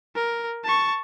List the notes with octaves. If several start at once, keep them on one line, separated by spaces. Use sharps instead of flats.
A#4
A5 C#6